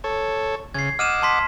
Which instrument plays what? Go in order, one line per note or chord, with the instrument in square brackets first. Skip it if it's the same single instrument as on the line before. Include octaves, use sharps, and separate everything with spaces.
[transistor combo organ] A4 C#5
[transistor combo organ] C#3 [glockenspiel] G#6 C7
[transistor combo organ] D#5 F#5 D6 [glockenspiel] F6 D#7 E7
[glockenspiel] A5 C6 B6